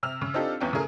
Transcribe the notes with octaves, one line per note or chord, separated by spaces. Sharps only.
C3 E6 F6 F7
C#3
C4 D4 D#4 F4 G4 A4
G1 E2 C#4 G5
C#3 A3 G#4 A#4